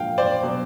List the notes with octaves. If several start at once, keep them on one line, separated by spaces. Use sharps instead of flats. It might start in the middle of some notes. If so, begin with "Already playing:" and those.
Already playing: A#2 F3 F5 G5
C5 D5
B2 F#3